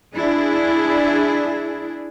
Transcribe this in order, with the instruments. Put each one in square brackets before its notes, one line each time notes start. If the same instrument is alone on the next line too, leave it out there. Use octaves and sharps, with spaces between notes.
[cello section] D4 E4 G#4